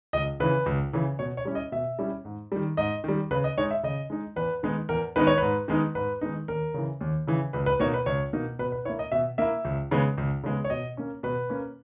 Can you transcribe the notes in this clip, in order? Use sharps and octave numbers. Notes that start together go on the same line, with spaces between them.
C#2 D#5
C#3 E3 B4
C#2
C#3 E3
B2 C#5
C#5
G3 C#4 E4
D#5
B2 E5
G3 C#4 E4
G#2
D#3 G3
G#2 D#5
D#3 G3
C#3 B4
D#5
G#3 D#4 C#5
E5
C#3 D#5
G#3 D#4
E2 B4
D#3 G#3 B3 D#4
E2 A#4
D#3 G#3 B3 D#4 B4
C#5
G#2 B4
D#3 G#3 B3 D#4
G#2 B4
D#3 G#3 B3 D#4
D#2 A#4
C#3 E3
D#2
C#3 E3
C#2 B4
B4
B2 A#3 D#4 C#5
B4
C#2 C#5
B2 A#3 D#4
B2 B4
B4
A#3 E4 C#5
D#5
B2 E5
A#3 E4 E5
C#2
C#3 G#3 B3
C#2
C#3 G#3 B3
C#5
B2 D#5
A#3 C#4
B2 B4
A#3 C#4